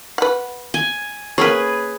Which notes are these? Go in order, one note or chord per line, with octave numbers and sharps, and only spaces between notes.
B4 F#5
G#5
A#3 C#4 G#4 B4 C#5